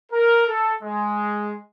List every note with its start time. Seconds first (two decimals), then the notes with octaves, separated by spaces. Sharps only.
0.10 A#4
0.45 A4
0.82 G#3